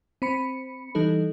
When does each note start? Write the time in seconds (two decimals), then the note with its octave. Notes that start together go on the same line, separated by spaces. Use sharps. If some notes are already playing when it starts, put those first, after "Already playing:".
0.22 C4 B5 C#7
0.95 E3 G3 D#4 A4